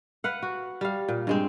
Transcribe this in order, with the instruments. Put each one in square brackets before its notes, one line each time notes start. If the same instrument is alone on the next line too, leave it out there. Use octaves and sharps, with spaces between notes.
[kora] B4 F5 F#5
F#4
G3 F5
A#2
G2 G#3 C4